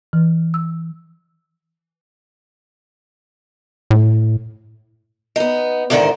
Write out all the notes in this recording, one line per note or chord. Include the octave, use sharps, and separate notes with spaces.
E3
E6
A2
B3 D#4
E2 G#2 D3 D#3 A#4 C5